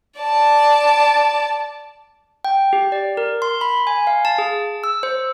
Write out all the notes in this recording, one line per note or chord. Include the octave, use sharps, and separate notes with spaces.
D5 A5
G5
G4
D5
A#4
C6
B5
G#5
F5
A5
G#4
E6
C5